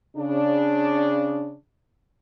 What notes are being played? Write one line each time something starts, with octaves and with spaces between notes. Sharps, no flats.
C#3 D4